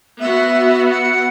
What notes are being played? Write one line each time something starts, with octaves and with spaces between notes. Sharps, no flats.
B3 F#4 E5
F#5